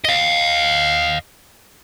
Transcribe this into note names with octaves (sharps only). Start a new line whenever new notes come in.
D#5 F5